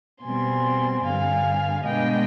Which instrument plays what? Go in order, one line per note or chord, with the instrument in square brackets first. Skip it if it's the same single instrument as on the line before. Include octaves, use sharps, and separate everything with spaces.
[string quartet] B2 G3 C4 G#5 C6
G2 D3 G3 F5 G#5
B2 G#3 B3 D4 D#5 G5